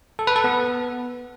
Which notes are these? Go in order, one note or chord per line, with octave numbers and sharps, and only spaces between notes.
A4
B4
A4
B3